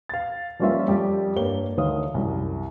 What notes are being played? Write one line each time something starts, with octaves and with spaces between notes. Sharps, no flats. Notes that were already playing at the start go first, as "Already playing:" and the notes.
F5 A6
F3 G3 A#3 C#4 F4 E5
F2 G3 G4
G2 A#3 C#5 G7
D2 D#3 C#5 F5 D#6
C2 F#2